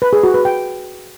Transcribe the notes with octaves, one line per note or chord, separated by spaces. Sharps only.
B4
G#4
F#4
B4
G5